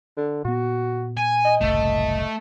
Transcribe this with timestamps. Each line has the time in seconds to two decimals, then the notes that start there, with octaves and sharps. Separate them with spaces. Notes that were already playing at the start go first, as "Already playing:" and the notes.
0.17 D3
0.45 A#2 B3 F#4
1.17 G#5
1.45 D#5
1.61 F#1 C2 A2 A3